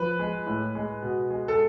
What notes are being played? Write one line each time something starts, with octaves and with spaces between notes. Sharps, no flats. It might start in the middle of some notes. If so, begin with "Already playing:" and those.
Already playing: F3 B4
G#3
A2
G#3
B2
G#3
A4